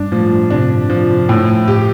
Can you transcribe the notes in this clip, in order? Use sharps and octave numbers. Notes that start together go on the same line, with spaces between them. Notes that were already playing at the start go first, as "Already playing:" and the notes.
Already playing: G2 D4
A2 F3
C3 D4
F3
A2
G4